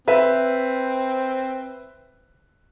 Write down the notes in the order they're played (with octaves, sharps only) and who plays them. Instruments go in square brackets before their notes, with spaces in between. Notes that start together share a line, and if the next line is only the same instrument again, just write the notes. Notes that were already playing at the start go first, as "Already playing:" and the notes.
[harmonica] C4 [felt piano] B4 E5